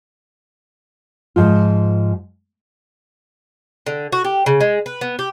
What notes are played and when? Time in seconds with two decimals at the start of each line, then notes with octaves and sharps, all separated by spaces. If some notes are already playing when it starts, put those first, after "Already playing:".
1.36 G#2 F3 F4
3.86 D3
4.12 F#4
4.25 G4
4.46 C#3
4.61 G#3
4.86 B4
5.01 B3
5.19 G4